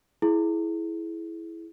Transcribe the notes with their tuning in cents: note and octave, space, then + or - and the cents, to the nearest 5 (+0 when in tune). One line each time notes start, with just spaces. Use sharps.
E4 +0 G#4 +25